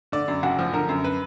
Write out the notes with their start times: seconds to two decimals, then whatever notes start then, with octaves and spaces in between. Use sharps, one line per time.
0.12 D3 D5
0.28 F#2
0.43 F#1 F#4
0.59 F3
0.73 D3 A#4
0.89 F#2
1.04 B4